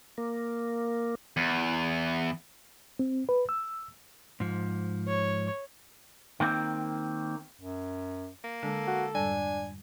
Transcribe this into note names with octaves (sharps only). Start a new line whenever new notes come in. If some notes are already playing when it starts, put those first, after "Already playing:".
A#3
E2
C4
B4
E6
G#2 F3
C#5
D#3 A#3 C4
F#2
A#3
D3 G#3 D4 A4
F#4
F2 G#2 G3 D4 G#5